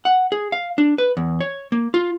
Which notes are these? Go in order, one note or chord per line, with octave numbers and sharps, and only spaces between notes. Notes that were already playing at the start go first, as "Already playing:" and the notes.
F#5
G#4
F5
D4
B4
E2
C#5
A#3
F4